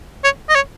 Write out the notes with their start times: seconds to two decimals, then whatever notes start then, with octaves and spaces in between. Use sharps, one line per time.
0.24 C#5
0.49 D#5
0.55 C#5